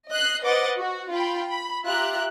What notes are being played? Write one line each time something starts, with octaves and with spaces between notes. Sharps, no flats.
D#5 F#6 C7
B4 C5 D#5 F#5 D6 A6
F#4
F4 G5 B5
B5
F4 G4 E5 A#5 F#6